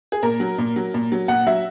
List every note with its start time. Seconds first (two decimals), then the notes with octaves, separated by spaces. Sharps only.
0.12 G#4
0.23 A#2 A#4
0.40 F#3
0.58 A#2
0.76 F#3
0.94 A#2
1.12 F#3
1.28 A#2 F#5
1.47 F#3 E5